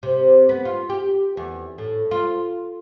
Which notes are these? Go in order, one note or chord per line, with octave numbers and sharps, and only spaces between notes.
C3
B3
F4
G4
E2
A2
F4